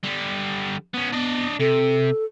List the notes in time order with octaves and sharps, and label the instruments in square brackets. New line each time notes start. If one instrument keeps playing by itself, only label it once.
[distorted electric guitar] D3 G3
B3 C#4
[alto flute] B3 [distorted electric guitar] D4 D#5
[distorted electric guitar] C3 [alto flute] A4